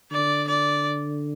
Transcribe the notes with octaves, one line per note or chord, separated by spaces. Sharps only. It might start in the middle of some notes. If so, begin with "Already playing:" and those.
D3 D5
D5